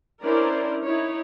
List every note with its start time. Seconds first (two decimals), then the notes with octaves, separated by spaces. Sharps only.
0.23 C#4 D4 E4 A#4 C5 D5
0.85 D#4 E4 C#5